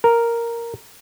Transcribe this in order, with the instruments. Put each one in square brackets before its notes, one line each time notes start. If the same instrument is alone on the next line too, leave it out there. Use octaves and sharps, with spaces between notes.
[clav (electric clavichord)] A#4